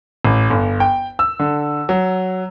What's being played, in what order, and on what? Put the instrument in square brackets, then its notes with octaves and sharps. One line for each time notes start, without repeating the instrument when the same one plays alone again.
[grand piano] A1
G1
G5
E6
D3
F#3